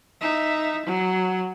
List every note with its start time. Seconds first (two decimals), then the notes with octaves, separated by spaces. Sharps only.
0.21 D#4 E5
0.86 F#3